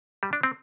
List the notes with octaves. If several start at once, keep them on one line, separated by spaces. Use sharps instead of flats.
G3
D4
C4